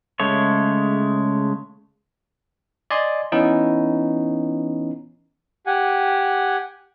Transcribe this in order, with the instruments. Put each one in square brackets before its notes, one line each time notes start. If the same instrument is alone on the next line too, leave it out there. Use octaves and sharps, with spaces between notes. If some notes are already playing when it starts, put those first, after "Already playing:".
[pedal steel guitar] C#3 G#3 A3 C#5
[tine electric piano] D5 D#5 G#5 C6
E3 B3 C#4 D#4 E4
[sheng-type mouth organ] G4 F#5 G#5